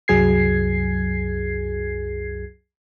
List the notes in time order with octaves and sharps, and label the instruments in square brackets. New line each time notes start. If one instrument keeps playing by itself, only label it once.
[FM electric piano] C2 F#2 F#3 G#4 G#6 C7